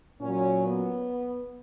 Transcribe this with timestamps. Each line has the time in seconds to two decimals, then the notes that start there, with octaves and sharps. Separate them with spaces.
0.20 A#2 F#3 C#4
0.66 B3